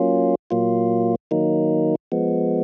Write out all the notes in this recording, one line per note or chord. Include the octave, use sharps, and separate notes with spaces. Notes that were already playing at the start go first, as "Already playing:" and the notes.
Already playing: F#3 A#3 C#4 F4
A#2 F#3 A#3 F4
D#3 F#3 A#3 D#4
F3 G#3 B3